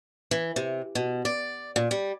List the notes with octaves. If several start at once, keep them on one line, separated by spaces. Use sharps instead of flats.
E3
C3
B2
D5
A#2
G3